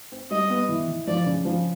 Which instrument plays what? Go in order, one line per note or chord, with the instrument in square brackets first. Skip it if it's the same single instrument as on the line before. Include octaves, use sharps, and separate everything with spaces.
[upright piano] C4
[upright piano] G3 [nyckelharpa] D#5
[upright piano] B3
E3
E3
[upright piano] F3 [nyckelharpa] D5
[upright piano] C#3
F3